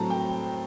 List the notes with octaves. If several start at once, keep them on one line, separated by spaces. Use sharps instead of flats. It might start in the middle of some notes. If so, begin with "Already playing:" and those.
Already playing: A2 F#3 A3 C4 A5 A#5
G5